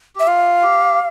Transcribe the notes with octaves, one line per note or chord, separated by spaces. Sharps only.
G4 E5
F4 F5
G4